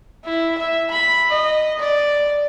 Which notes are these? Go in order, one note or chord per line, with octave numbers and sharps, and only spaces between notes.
E4
E5
B5
D#5
D5